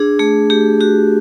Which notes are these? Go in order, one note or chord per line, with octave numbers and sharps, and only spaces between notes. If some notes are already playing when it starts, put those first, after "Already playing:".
Already playing: D4 G#4
A3 G#4
A3 G4
F#4 G4